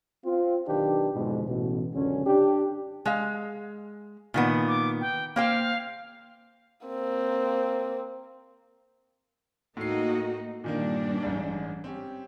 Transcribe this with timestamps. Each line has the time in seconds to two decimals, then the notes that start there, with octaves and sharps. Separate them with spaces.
0.25 C4 F4
0.68 B1 D#3 D4 G4 B4
1.15 F2 G#2 B2 D3 G#3
1.47 A1 B2
1.94 C#2 F#2 D3 C#4
2.26 D4 G4
3.06 G#3 F5
4.34 A#2 D#3 B3
4.68 D6
5.01 G5
5.36 A#3 C5 F5 G5
6.86 A#3 C4
9.77 A2 A#3 D#4 F#4 C7
10.64 G2 A#2 D#3 A#3 D4
11.23 A1 G#2
11.84 C4 C#4 G4